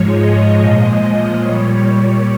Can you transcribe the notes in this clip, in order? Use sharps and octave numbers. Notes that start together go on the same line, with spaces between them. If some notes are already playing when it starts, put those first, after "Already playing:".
Already playing: G#2 F3 G#3 C#5
D#5
A#2 F3 G#3 D#5
A#2 G3 C#5